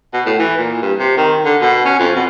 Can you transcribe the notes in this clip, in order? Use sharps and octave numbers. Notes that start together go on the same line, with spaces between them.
B2
A2
E3
A#2
G2
C3
D#3
D3
B2
C#4
F2
B2